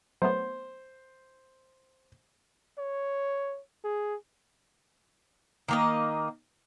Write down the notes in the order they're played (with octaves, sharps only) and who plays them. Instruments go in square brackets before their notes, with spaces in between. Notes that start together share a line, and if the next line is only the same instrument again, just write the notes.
[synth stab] F#3 A3 B3 [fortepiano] C5
[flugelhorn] C#5
G#4
[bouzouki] D#3 A#3 D#5